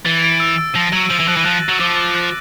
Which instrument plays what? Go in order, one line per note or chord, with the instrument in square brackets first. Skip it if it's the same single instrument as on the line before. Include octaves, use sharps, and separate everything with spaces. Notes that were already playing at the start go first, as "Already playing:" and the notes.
[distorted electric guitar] E3 [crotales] A6
[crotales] D7
E6
E6
[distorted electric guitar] F3 [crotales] A#6
[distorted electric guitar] F#3 [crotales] D#7
[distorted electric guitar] F3 [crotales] F#7
[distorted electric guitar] E3
[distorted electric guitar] F3 [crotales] F#6
[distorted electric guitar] E3
[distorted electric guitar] F3 [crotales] F#6
[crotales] A6
[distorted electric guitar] F#3
[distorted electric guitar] F3 [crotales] D6
[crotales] D6
F#6